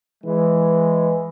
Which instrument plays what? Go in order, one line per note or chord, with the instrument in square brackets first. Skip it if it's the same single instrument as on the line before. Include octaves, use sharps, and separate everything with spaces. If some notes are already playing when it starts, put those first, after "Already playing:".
[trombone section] E3 G#3